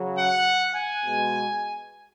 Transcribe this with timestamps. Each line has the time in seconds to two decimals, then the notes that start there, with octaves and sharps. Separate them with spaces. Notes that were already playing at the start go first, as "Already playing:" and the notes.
Already playing: C#3 F#3
0.18 F#5
0.75 G#5
1.05 B2 G#3